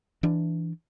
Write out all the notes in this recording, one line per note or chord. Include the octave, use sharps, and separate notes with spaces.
E3 D4